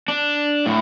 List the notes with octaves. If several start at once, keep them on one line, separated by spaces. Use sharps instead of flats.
D4
A2